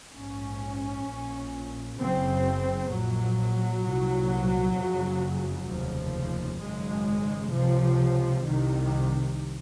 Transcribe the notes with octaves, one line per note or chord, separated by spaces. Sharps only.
A#1 G#2 C#4
A#1 A#2
F#1 F#2 C#3 C4
A#1 A#2 F#3
C2 A#2
F#1 F2 C#3
F1 D#2 C#3 F3
G#1 F#2 C#3 G#3
C#2 C3 F3
C2 C3 D#3